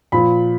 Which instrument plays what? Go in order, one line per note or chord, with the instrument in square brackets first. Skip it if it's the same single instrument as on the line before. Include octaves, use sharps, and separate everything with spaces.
[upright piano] A#2 F3 B5